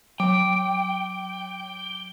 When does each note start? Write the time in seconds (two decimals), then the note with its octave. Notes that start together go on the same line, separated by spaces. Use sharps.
0.20 F#3 G5 D6